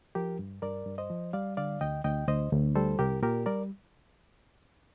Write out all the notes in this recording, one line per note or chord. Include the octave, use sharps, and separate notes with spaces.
F3 G4 A#4
G2
G2 A#4 D5
G2
C5 D#5
F3
G3 D5 F5
D3 D5 F5
D2 D#5 G5
D2 D#5 G5
D2 C5 D#5
D2
G3 A4 C5
C2 G4 A#4
A#2 G4 A#4
G3 A#4 D5